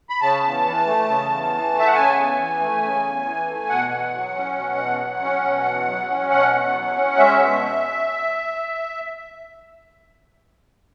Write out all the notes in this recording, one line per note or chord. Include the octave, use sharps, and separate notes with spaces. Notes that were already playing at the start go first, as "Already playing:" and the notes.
B5
C#3 A5
E2
E3
A3
C#3
E2
E3
A3
E5
F#5
C#3 G#5
E2
E3
A3
C#3
E2
E3
A3
B2 F#5
E2
F#3
C#4
B2
E2
F#3
C#4
B2
E2
F#3
C#4
B2 F#5
E2
F#3
C#4
G#3 E5
B2